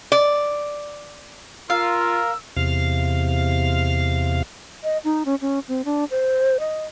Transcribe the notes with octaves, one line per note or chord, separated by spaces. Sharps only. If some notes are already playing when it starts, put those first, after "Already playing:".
D5
F4 A#4 F5 E6
E2 C3 F5
D#5
D#4
C#4
C#4
C4
D4
C5
D#5